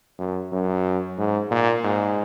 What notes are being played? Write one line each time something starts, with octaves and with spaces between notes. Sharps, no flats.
F#2
F#2
G#2
A#2
G#2